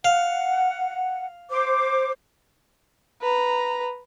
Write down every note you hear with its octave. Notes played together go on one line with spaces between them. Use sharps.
F5 F#5
C5 D6
B4 A#5